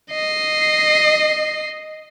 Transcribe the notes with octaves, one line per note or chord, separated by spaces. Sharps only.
D#5 C7